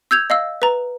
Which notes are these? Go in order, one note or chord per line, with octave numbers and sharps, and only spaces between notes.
E6 G6 G#6 F7
D#5 F5 E6
B4 A#5